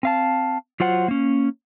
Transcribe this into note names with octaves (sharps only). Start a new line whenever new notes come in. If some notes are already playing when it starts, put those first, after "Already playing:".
C4 F5 A5
F#3 F4 C5 F#5
A#3 C#4